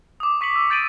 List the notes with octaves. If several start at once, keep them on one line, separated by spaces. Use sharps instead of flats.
D6 D#6
C#6 B6 C#7 F#7
E6
G6 A6 D7 D#7 F#7